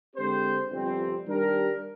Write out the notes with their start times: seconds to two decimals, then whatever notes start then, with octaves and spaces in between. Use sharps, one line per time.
0.15 D3 G#3 C4 G4 C5
0.71 G1 F2 C3 G3 C4
1.26 D#3 G3 D4 G4 A#4